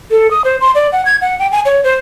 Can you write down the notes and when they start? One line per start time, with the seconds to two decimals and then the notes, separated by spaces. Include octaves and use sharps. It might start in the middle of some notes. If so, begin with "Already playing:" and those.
0.11 A4
0.31 D#6
0.44 C5
0.61 C6
0.75 D5
0.92 F#5
1.06 G#6
1.21 F#5
1.39 G5
1.52 G#5
1.65 C#5
1.84 C5